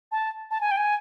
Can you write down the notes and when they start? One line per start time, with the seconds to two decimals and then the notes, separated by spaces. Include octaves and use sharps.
0.12 A5
0.51 A5
0.61 G#5
0.71 G5
0.77 G#5